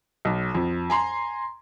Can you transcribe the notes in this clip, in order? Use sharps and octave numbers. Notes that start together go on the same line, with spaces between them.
B1
F2
G#5 A#5 C6